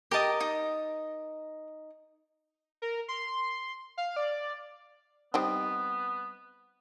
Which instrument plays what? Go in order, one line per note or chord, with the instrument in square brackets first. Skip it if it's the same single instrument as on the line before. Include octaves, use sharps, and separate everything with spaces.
[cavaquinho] G4 A5 [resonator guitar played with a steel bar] A#4 D#5
[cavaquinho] D#4
[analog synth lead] A#4
C6
F5
D5
[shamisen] G3 C4 D#4 [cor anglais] B3